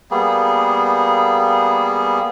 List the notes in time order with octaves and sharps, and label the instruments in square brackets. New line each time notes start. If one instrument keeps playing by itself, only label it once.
[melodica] G3 A#3 B3 G#4